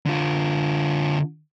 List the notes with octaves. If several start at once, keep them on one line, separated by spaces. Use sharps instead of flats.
D3 F4